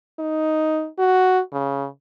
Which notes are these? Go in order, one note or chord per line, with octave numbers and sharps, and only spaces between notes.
D#4
F#4
C#3